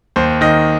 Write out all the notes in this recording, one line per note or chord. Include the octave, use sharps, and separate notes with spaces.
D#2 C5
D#3 D#5